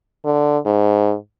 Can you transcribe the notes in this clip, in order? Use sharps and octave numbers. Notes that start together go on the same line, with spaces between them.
D3
G#2